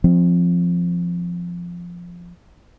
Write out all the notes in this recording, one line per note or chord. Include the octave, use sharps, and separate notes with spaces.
F3 C4